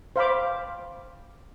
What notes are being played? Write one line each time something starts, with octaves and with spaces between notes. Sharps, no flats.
C5 F5 B5 D6